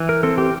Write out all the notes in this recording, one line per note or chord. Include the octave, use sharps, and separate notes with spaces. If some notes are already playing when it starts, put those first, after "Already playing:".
Already playing: E3
A#4
C4 A4
G4